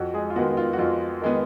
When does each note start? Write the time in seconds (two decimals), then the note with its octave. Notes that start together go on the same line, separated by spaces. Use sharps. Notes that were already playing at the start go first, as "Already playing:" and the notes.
Already playing: F2 F#4
0.14 G#3 G#4
0.30 F4
0.36 D#3 G#3 B3 F#4
0.57 F4
0.73 F#4
0.78 F2 F4
1.22 D#3 G#3 B3